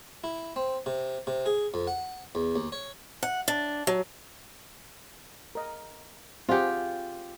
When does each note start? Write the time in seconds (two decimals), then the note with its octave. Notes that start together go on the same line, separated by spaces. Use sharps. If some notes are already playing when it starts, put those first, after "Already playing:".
0.24 E4
0.56 C4
0.86 C3
1.27 C3
1.46 G#4
1.74 F2
1.87 F#5
2.35 E2
2.56 D#2
2.72 C#5
3.23 F#5
3.48 D4
3.87 F#3
5.55 A#4 D#5
6.49 C4 F4 G4 G#4 F#5